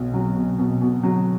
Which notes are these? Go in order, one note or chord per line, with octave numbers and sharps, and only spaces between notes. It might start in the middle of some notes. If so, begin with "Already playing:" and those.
Already playing: B1 B2
F#3
B2
B2
B2
F#3